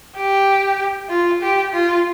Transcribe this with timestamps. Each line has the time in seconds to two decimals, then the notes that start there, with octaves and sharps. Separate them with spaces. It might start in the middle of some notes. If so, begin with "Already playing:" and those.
0.16 G4
1.09 F4
1.41 G4
1.73 F4